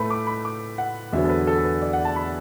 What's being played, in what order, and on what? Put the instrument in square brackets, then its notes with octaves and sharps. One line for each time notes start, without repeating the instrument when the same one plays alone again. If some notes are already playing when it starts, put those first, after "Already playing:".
Already playing: [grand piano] A2 A3 B4 B5
D6
B5
D6
F#5
E2 D3 F#3 B3 E5
A4
B4
A4
A4
B4
D5
F#5
A5
B5